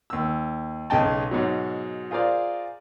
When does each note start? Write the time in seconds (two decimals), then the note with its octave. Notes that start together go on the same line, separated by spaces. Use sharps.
0.10 D#2 E6
0.90 B1 C#3 D#5 G5 A5
1.31 G#2 B2 F#3
2.11 F4 G#4 A#4 C5 D5 F5